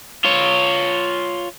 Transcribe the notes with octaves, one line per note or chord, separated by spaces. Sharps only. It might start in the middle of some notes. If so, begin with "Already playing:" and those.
F4 C#5